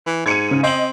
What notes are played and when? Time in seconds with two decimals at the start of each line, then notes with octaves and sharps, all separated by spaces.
0.06 E3
0.26 G#2 G#6 C#7 D#7
0.48 C#3 D#7
0.63 C4 D#5 F#7